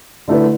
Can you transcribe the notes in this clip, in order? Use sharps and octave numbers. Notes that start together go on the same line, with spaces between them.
D3 A3 E4 B4